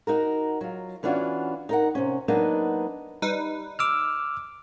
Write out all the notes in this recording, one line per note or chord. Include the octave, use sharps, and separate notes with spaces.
D#4 F#4 A#4
F#3 F4
E3 B3 C#4 D4 F4 F#4
D#4 A#4 F#5
C3 C#4
F#3 A#3 B3 D4 D#4 D#5
G3 D#4 B4
D6 E6 F6